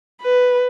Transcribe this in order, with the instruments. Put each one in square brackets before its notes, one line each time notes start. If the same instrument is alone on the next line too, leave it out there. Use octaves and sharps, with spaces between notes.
[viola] B4